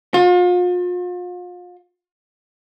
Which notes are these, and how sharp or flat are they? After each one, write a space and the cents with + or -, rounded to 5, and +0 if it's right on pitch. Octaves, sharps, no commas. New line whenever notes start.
F4 +40